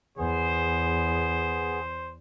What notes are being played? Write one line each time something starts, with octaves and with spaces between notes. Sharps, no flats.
E2 B3 G#4 C5